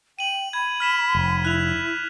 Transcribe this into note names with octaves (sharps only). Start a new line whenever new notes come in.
G5 D#7 F#7
B5 G#6
F6 B6 E7
F1
E4 F#6 F7